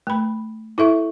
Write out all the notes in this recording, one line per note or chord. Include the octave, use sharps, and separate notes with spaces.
A3 B5
E4 A4 E5 C#6